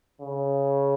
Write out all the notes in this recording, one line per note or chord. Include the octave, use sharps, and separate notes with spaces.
C#3